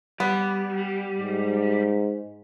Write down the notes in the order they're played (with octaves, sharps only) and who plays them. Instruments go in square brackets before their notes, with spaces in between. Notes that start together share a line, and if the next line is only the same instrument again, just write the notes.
[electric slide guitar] G3 [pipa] B3
[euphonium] G#2